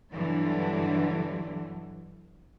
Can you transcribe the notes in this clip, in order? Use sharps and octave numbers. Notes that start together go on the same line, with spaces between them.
G2 B2 D3 E3 F#3